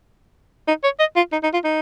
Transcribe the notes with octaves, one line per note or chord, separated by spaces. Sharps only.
D#4
C#5
D#5
F4
D#4
D#4
F4
D#4